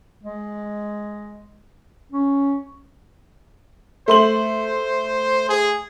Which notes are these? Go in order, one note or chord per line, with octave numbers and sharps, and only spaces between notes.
G#3
C#4
A3 C5 C6 F#7
G#4